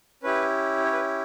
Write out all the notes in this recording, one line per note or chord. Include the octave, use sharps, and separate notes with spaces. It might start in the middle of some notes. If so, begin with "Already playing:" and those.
C#4 E4 G4 B4
C#5
B4